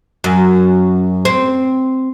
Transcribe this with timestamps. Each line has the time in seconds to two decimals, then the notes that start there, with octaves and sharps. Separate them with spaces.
0.24 F#2
1.25 C4